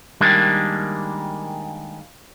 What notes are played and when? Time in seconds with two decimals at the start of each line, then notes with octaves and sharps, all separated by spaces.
0.21 D#3 G3 G#3 A#3 D4